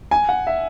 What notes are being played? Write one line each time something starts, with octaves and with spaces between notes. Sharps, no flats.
G#5
F#5
E5